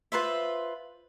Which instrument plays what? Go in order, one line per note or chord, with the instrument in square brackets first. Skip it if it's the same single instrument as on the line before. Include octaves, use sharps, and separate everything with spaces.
[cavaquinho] F4 B4 C5 E5